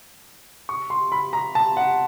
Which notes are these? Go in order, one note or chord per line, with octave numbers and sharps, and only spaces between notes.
C#6
C6
B5
A#5
A5
F#5